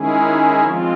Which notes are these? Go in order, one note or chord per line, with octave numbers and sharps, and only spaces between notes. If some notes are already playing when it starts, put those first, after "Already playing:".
Already playing: D#3 G#3 C#4 E4 G#4
F3 G#3 C4 F4